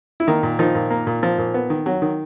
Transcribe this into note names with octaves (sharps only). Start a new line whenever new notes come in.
E4
D#3 A#3 D#4
A#2
D#3 F3 D#4
A#2
A#3
A#2
F3
A#2
B3
D#3
F#3
D#3